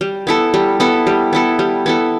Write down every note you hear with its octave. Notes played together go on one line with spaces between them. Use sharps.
G3
B3 E4 A4
G3
B3 E4 A4
G3
B3 E4 A4
G3
B3 E4 A4